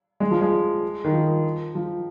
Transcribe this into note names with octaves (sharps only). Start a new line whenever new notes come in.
G#3
F3
G#3
D#3
F3
F3